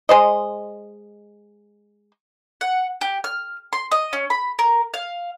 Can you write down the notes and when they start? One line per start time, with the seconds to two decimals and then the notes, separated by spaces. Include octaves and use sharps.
0.09 G#3 C5 D#5
2.61 F#5
3.01 G4
3.24 F6
3.73 C6
3.91 D#5
4.13 C#4
4.30 B5
4.59 A#4
4.94 F5